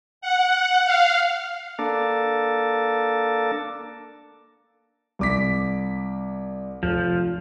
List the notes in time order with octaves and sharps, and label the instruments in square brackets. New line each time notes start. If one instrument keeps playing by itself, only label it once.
[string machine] F#5
F5
[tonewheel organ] A#3 D4 A4
[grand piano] C2 D6 B6
[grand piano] F1 [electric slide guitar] F3